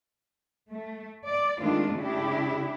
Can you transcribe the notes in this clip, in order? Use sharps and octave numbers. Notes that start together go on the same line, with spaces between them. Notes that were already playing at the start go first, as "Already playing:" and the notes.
A3
D5
D#3 G#3 A3 C4 D4 F4
C#3 D4 E4 G4